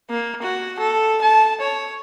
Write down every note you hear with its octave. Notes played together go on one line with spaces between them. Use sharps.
A#3
F#4
A4
A5
C#5